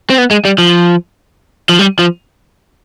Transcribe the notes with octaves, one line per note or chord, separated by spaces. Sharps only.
C4
B3
G#3
G3
F3
F3
G3
F3